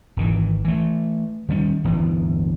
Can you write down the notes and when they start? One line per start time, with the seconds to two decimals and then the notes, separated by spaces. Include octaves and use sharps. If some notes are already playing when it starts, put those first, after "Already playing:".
0.17 G#1 D#3 E3
0.65 E3 A3
1.49 D#3 G3 C#4
1.84 D1 G2 E3 B3